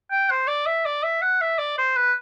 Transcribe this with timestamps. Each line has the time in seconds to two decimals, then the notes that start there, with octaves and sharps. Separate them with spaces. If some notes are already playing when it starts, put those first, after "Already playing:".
0.11 G5
0.30 C5
0.48 D5
0.66 E5
0.86 D5
1.03 E5
1.22 F#5
1.41 E5
1.59 D5
1.78 C5
1.96 B4